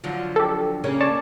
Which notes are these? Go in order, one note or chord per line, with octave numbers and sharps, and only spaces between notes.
D3 F3 F#3
G4 A4
C#3 A#3 C#4
C#5 D5 A5